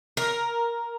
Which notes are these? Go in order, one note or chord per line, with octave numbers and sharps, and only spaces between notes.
A#4